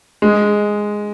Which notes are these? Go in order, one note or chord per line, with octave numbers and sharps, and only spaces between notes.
G#3